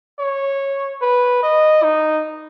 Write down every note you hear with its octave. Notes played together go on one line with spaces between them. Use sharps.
C#5
B4
D#5
D#4